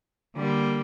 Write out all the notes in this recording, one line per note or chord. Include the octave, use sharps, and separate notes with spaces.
D3 G3 A#3